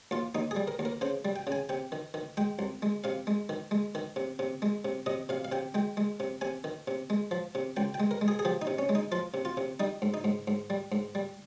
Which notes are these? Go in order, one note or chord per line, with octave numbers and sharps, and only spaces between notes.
D#2 F4
D#2 D#4
G#4
G3
A#4
D#2
A#4
C#3 C5
G3
G5
C#3
G#5
C3 G5
D#3
D#3
G#3 G5
C2
G#3
C3 F5
G#3
D#3
G#3
D#3
C3
C3
G#3
C3
C3 D#5
C3 F5
F5
C3 G5
G#3 G5
G#3
C3
C3 G#5
D#3
C3
G#3
F3
C3
C#2 G5
G5
G#3
A#4
G#3
G#4
G#4
F3 G4
D#4
C3
C#4
G#3
D#4
F3 F4
C3
F4
C3
G3 D#4
G#2
D#4
G#2
G#2
G3
G#2
G3